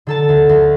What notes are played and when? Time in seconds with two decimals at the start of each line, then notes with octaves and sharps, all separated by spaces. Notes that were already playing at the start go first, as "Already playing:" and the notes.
0.07 D3 A4 A5
0.29 D2
0.49 D2